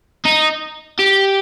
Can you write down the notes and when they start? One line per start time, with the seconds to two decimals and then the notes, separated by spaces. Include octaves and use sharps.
0.25 D#4
0.99 G4